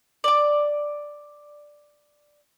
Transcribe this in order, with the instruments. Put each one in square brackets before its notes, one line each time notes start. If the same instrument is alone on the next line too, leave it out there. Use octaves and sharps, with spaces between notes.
[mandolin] D5 D6